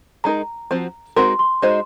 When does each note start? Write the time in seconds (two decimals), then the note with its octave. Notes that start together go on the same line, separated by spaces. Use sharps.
0.24 G#3 D#4 A#4 A#5
0.71 F3 C4 F#4
1.16 G#3 C4 D#4 F#4 A#4 C6
1.39 C6
1.62 G#3 D#4 F#4 C5 D#5